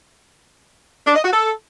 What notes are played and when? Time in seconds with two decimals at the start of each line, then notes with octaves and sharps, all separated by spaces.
1.07 D4
1.16 D#5
1.24 F#4
1.33 A4